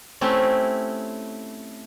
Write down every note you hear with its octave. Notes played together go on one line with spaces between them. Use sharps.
A3 C4 C#4 E4 G4